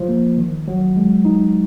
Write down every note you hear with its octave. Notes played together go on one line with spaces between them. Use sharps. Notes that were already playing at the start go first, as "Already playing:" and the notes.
Already playing: F3
A#3
D#3
F#3
G#3
D#4